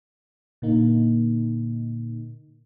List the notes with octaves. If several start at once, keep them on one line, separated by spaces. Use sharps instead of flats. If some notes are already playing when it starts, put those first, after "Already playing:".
A#2 D3 A#3 D#4